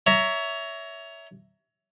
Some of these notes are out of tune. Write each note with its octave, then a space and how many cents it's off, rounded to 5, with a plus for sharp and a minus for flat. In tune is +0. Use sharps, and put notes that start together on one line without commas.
C#5 +25 E5 +0 A#5 +0